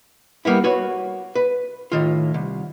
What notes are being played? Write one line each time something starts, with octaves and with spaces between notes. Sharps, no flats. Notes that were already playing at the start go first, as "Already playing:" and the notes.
G3 A#3 B3 E4
F#4 B4 C#5
B4
A2 D#3 F4
C2